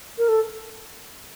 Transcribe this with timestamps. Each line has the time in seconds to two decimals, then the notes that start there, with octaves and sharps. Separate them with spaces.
0.18 A#4
0.28 A4